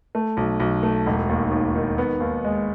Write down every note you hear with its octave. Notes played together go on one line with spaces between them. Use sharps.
A3
B1
B1
A3
E1
D#2
D#2
D#3
B3
D#2
G#3